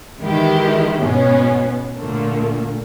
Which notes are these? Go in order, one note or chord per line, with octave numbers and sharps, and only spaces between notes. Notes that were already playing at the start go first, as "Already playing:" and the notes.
D#3 E3 G#3 E4 G4
G#2 B2 B3 C#4
A#2 D3 A3 A#3